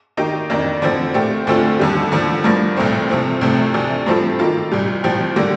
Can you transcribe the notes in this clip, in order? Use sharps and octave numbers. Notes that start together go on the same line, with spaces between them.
D#3 A#3 D#4 G4
F2 D#3 A#3 D4
D3 F3 C4
A#2 A3 C4 G4
D2 D3 A3 C4 F4
D#2 D3 G3
D#2 D3 F3
G2 F3 A#3
C2 A#2 A3 C4
C3 F3 A3 C4
C2 C3 F3 A3 C4
D2 C3 F3 A3 D4
G2 F3 C4 F4 A4
D#3 A#3 F4 A4
C2 A#2 G3
C2 A#2 F3 C4 G4
D3 G3 A#3